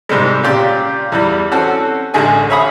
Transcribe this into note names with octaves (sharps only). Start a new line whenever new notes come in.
G#2 C3 G3 G#3
A#2 C#3 G4 D5
E2 E3 G3
C4 C#4 F#4 A4
A1 D3 G#3 G#4 G#5
C#5 E5 F5 B5 D#6